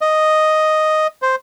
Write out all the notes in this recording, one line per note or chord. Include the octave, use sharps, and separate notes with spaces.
D#5
C5